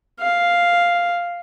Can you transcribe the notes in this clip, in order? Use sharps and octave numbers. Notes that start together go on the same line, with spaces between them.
F5